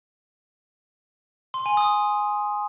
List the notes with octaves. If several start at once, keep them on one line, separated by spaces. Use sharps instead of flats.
C6
G#5
D#6